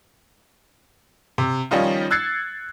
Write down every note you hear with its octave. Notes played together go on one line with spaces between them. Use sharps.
C3
D#3 F3 G3 C#4 D#4 F4
E6 F#6 G#6 A6 C7 C#7